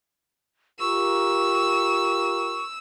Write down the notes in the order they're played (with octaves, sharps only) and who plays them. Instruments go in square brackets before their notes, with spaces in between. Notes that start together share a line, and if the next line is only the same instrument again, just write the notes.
[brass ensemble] F4 G4 A#4 [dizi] C#6 [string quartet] E6